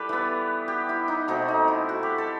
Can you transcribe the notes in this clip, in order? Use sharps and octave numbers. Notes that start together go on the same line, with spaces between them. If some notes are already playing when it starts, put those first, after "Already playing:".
Already playing: G3 E4 G4 A4 B4
E3 B3
G4
E4
D#4
B2 A3 C4 D#4
D#4
E4
F#4
G4
A4